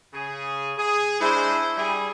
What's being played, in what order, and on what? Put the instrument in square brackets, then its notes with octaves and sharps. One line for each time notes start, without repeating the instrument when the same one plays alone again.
[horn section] C#3 G#4
G#4
[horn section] G#3 D4 C5 [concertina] E4
[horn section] G3 G#4